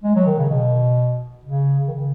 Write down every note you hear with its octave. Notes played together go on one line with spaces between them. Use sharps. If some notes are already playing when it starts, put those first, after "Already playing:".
G#3
F#3
D#3
C#3
B2
C#3
D#3
C#3